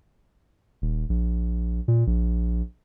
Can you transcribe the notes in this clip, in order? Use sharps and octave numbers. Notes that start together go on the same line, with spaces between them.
D#1
A#1
A#2
A#1